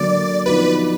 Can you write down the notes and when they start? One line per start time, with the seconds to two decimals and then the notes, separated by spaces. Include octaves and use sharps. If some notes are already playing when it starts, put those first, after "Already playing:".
Already playing: D3 F#3 A#3 D5
0.46 F3 B3 D#4 F#4 B4